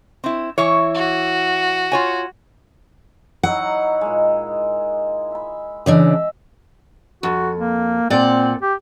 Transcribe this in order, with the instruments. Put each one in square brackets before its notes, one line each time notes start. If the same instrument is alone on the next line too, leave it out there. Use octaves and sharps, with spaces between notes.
[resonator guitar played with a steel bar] C4 E4
E3 E4 C#5
[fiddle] F#4
[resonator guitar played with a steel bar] F4 C#5 G#5
[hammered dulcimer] F#3 D#4 E4 [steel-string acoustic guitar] F#5
[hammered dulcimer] A#2 G#3
E5 B5
[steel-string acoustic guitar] C#3 E3 D4 [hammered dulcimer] D#5 E5
[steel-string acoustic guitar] F2 [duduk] F#4
[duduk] A#3
[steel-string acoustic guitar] A#2 D5 F#5 [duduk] C4
[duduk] G4